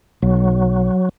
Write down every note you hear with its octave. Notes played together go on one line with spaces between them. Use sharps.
B1 F#3